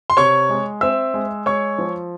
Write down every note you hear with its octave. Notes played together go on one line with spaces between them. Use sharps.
C6
C3 C#5 C#6
G#3
C4 E5 E6
G#3
G#3 C#5 C#6
F3